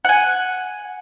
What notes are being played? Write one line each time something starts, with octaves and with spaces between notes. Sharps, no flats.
F#5 G#5